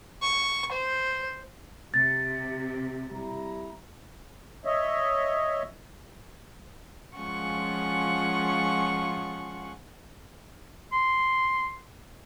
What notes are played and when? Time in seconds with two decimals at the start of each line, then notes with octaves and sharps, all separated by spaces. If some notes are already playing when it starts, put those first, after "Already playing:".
0.22 C#6
0.72 C5
1.94 C3 A6
3.12 G3 E4 A#5
4.65 C#5 D#5 E5
7.17 F3 G#3 C#4 F4 F#5 C#6
10.93 C6